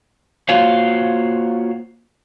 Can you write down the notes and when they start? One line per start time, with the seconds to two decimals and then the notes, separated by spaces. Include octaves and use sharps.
0.49 A#3 F4 F#4 C5 C#5 F5